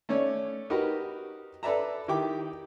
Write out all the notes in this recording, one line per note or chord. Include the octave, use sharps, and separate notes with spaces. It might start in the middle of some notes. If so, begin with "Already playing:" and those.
A3 C#4 C#5 D5
D#4 F#4 G4 A#4 B4
A4 B4 D5 E5 A#5
D#3 E4 G4 G5 D6